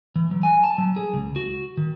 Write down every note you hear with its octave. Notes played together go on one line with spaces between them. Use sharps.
E3
F#3
G#5
A5
F#3
G#4
C#2
F#4
D#3